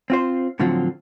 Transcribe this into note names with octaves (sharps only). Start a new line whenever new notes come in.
C4 F4 C5
A2 D3 F3 F#3 C4